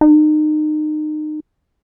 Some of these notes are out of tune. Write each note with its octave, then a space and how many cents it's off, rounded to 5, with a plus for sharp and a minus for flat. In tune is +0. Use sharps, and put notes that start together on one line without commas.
D#4 -30